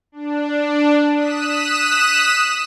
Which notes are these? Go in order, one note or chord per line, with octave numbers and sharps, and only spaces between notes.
D4
D#6 F#6 B6 E7